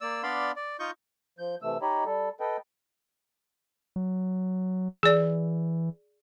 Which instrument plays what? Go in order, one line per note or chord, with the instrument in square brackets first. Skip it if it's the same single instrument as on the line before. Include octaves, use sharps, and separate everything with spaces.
[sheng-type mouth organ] A#3 D5 E6
B3 D4 D5 F5 B5 C6
D5
D#4 F4 D#5 C#6 G6
[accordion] F3 G6
C3 E3 A3 E6
D#4 G4 C#5 D#5 B5
G3 A4
A4 B4 D#5 G5
[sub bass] F#3
[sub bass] E3 [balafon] G#4 D5